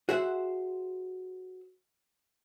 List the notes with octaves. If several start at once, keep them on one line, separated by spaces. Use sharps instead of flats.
F#4 G#4 C5 E5 F#5